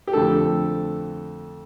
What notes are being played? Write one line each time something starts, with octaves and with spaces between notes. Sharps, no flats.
G4
F2 D3 A3 A4